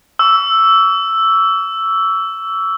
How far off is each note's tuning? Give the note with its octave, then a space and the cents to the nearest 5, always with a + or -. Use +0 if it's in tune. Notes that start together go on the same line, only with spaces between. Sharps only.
C#6 +45 E6 +0